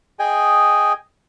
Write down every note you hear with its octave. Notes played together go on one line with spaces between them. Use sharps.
G#4 D#5 G5 G#5